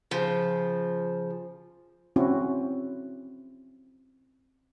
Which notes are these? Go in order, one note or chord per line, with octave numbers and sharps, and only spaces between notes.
C#3 F3
C4 C#4 E4 F#4